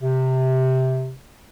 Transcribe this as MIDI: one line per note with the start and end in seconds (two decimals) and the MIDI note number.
0.01 1.12 48